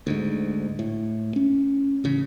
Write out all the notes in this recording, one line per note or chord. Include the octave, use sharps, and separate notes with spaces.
D2 G#2
A2
C#4
A1 C#3